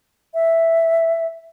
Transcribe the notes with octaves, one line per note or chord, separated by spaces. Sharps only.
E5